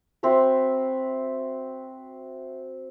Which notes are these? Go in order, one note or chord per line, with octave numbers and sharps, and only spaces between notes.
C4 F#4 E5 B5